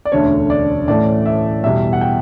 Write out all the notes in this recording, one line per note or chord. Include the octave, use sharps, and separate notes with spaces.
D5
E1 D2 D3 A3 C#4 C#5
D5
A2 E3 A3 C#4 D5
E5
E2 B2 G3 E5
F#5
G5